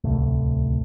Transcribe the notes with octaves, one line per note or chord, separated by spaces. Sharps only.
D1 C2 A2